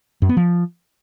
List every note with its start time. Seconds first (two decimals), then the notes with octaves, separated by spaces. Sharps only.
0.22 F#2
0.29 B3
0.37 F3